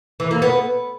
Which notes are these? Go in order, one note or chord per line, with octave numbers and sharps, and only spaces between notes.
E3
A#3
B3